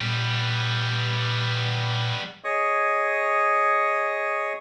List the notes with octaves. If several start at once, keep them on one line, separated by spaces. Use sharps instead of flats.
A#2 G3 B3
G#4 C#5 D#5 C#6 D#6